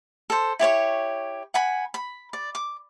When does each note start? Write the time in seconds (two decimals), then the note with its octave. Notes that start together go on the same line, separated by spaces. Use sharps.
0.30 A4 C5
0.59 E4 G4 C#5 C#6
1.54 F#5 G#5 B5
1.94 B5
2.33 D5
2.55 D6